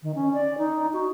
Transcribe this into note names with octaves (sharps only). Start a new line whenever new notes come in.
D#3
C#4
D5
D#4
F#4